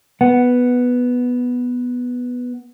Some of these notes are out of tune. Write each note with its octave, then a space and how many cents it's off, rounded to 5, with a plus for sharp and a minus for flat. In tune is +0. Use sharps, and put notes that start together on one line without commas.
B3 +0 F#5 +0